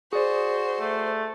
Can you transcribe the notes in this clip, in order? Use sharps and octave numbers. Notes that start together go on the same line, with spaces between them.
F#4 G#4 C5 D5
A3